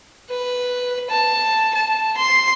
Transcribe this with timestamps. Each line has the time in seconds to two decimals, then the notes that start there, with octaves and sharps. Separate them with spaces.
0.30 B4
1.10 A5
1.75 A5
2.17 C6